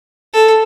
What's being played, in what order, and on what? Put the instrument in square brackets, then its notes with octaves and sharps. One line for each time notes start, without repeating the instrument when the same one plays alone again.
[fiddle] A4